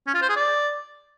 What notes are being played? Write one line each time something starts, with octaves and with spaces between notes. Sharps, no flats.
C#4
F4
C5
G#4
D5